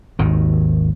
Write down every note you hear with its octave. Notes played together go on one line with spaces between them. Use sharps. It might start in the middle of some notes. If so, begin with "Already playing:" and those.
G#1 D#2 D#3